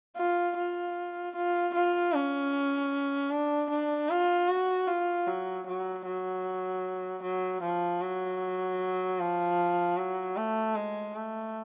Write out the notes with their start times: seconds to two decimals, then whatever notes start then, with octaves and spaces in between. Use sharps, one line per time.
0.17 F4
0.57 F4
1.36 F4
1.74 F4
2.13 C#4
3.31 D4
3.70 D4
4.10 F4
4.49 F#4
4.87 F4
5.27 F#3
5.66 F#3
6.05 F#3
7.23 F#3
7.63 F3
8.01 F#3
9.20 F3
9.97 F#3
10.37 A3
10.76 G#3
11.15 A3